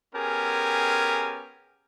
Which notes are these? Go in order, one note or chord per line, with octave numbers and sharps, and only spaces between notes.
B3 C#4 G4 G#4 A#4 G#5